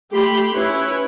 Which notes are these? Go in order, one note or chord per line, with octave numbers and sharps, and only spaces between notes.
A3 G4 B5 C6
C#4 E4 B4 C#5